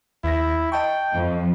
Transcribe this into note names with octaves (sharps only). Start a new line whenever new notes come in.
D#2 E4 A#6
D#5 G5 A5 C#6
F2